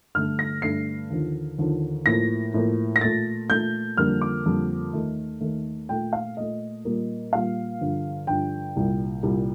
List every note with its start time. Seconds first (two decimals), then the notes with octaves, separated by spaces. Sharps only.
0.15 G2 D3 A3 F6
0.39 A#6
0.62 G2 D3 A3 C7
1.10 D#2 D3 F3
1.58 D#2 D3 F3
2.06 A2 F3 A#3 A#6
2.54 A2 F3 A#3
2.96 A#6
3.01 A#2 A3 A6
3.50 A#2 A3 G6
3.97 F2 D3 G3 A#3 F6
4.22 D6
4.46 F2 D3 G3 A#3
4.93 D#2 D#3 A3
5.41 D#2 D#3 A3
5.89 A#2 A3 G5
6.13 F5
6.36 A#2 A3 D#5
6.85 A#2 G3 A#3
7.32 A#2 G3 A#3 F5
7.80 G2 D3 F3
8.27 G2 D3 F3 G5
8.76 C2 A#2 G3
9.23 C2 A#2 G3